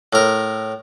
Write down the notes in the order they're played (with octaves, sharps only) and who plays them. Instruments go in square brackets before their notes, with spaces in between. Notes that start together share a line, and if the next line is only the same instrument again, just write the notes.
[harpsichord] A2 A#4